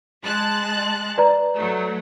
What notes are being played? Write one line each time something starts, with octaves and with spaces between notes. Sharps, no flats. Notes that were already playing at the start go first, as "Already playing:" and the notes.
G#3 A5 F#6
B4 D5 A#5
F#3 A3